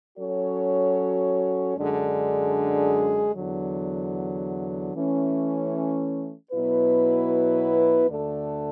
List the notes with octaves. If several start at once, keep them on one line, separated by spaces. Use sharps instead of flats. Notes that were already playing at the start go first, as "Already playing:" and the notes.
F#3 C#4 F#4 A4 C#5
F#2 D3 G#3 D4 G#4
E2 D3 F#3
E3 A3 C#4
B2 F#3 B3 E4 B4
D2 D3 A3 D4 A4